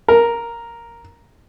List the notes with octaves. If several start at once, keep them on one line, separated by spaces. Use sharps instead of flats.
A#4